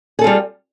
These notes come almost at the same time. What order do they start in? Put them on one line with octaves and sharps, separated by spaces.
G#4 A4 F4 G3